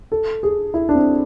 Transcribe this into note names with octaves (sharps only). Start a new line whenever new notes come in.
A4
G#4
E4
D4
C4